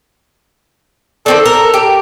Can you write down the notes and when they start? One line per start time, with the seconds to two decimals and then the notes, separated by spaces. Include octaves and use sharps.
1.26 D#3 C4 A4 D5
1.46 A#4
1.74 G4